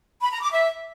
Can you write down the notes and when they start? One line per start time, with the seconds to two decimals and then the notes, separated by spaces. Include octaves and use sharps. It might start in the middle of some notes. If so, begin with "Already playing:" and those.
0.21 B5
0.32 A#5
0.42 D6
0.52 E5